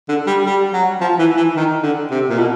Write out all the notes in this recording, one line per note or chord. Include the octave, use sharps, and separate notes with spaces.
D3
G3
G3
F#3
F3
E3
E3
D#3
D3
C3
A#2
B2